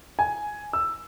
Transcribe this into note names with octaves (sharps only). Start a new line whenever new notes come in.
G#5
E6